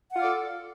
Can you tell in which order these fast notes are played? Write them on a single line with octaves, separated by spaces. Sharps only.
F#5 F4 F5 D5 A4